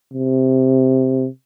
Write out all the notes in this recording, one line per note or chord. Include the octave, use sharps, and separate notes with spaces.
C3